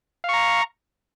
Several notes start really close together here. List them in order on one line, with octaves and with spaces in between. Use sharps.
F5 C#6 A#5